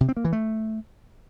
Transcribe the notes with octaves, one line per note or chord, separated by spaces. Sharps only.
C3
C4
A#3
E3
A3